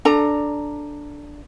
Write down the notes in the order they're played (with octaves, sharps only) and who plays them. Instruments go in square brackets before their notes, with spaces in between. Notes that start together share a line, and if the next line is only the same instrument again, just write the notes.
[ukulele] D4 A4 A#5